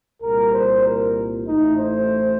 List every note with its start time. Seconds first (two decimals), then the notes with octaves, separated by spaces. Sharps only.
0.21 C2 A#2 G3 A#4
0.53 C5
0.84 A#4
1.46 A1 A2 A3 D#4
1.78 C5